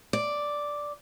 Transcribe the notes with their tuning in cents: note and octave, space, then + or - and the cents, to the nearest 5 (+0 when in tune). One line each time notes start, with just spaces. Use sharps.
D5 +0